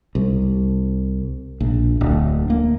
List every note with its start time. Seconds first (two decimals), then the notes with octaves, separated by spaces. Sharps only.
0.15 C2
1.60 A#1
2.01 D1
2.50 A#3